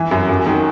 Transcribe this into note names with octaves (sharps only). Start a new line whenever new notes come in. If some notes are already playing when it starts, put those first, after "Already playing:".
Already playing: E3
F#2
F#2
D#3